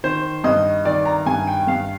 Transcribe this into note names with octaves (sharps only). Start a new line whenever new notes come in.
D#3 C5
G2 D#5
D#3 D5
A#5
G2 G#5
G5
G2 F5